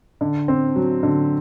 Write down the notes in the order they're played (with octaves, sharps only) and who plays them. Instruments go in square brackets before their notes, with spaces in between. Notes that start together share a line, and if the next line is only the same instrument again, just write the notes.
[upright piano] D3
C4
F#3
D3